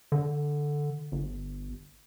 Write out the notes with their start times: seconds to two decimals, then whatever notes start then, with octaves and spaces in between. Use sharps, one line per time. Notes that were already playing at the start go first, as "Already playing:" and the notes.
0.12 D3
1.12 G1